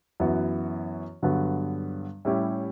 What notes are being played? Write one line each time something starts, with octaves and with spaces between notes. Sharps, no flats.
F#2 E3 B3 F#4
G2 D3 F#3 B3
A2 G3 C#4 E4 G4